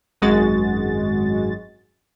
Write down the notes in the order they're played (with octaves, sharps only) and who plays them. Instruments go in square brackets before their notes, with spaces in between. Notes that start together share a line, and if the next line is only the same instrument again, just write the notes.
[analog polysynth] G#1 F#2 G#3 F#4 A6